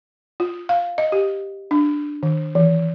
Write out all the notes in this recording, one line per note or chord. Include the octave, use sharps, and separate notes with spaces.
F4
F5
D#5
G4
D4
D#3
E3